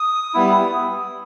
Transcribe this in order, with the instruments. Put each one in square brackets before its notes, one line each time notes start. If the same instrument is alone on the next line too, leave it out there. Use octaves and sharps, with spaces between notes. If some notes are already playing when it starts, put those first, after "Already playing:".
Already playing: [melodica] D#6
G3 B3 E4